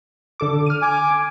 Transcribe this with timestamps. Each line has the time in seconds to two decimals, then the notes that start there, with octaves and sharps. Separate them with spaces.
0.40 D3 A4 D6
0.66 F6 D#7
0.82 G#5 D6